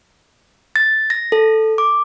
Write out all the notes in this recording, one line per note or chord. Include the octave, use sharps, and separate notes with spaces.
A6
A#6
A4
D6